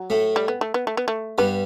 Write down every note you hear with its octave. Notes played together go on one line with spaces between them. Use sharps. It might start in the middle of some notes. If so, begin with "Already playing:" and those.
Already playing: F#3
A2 A3
G3
B3
A3
B3
A3
B3
A3
G2 G3 B3